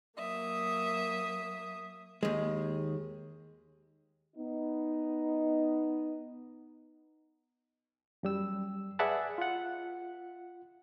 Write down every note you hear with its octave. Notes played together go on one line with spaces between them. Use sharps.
F#3 A#3 E5 D#6
D#2 G#3
B3 D#4
F#2 G3 E6
G#4 B4 D5 E5 F#5 A5
F4 F#5